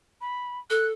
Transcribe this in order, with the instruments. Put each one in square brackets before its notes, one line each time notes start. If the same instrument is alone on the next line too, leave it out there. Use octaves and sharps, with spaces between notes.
[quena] B5
[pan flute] A4 [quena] F#6